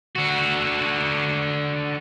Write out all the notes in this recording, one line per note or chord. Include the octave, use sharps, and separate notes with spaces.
D3 F#4